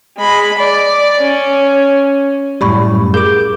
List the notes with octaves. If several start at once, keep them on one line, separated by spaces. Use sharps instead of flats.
G#3 B5
D5
C#4
F#2 A2 G3 D5 B5 C#6
G#4 A#4 D6 G6